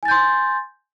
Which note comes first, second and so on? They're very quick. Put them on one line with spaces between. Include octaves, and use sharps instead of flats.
G#5 A6 G6 C6